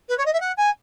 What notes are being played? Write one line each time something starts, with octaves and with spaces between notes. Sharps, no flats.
B4
C#5
D#5
E5
F#5
G#5